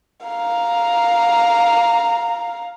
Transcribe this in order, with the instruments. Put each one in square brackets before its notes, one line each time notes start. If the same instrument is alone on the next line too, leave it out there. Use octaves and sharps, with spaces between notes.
[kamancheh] F5 A#5